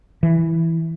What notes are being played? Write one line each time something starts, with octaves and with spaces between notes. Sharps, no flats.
E3